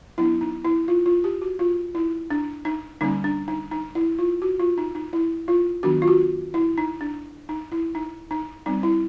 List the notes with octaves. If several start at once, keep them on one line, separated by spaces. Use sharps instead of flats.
F#3 B3 D4 E4
D#4
E4
F4
F4
G4
F#4
F4
E4
D4
D#4
D3 G3 A#3 C#4 D#4
D4
D#4
D#4
E4
F4
F#4
F4
D#4
D#4
E4
F4
D#3 F#3 B3 D4 F#4
F4
F#4
E4
D#4
D4
D#4
E4
D#4
D#4
G3 C4 D#4
E4